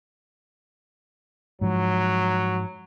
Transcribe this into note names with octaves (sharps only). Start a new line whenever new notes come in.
G#2 F3 F#3